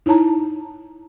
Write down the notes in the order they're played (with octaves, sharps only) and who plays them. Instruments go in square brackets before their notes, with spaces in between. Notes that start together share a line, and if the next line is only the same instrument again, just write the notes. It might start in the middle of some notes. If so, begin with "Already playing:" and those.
[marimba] D#4 E4 C#5 A5 A#5